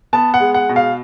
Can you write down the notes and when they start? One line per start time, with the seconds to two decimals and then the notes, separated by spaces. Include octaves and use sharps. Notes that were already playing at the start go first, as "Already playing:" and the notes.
0.13 B3 A5
0.34 F#5
0.40 G#3
0.54 F#5
0.69 B2
0.76 F5